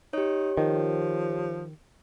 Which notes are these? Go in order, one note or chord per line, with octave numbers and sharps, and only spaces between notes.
D#4 G4 C#5
D#3 F3